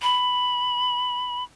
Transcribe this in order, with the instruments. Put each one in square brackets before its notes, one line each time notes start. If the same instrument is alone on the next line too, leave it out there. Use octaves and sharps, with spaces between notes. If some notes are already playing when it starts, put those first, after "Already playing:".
[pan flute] B5